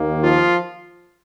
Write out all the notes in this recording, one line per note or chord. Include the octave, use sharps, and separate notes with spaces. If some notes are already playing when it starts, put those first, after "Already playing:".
Already playing: D#2 D#3 A#3
F3 F4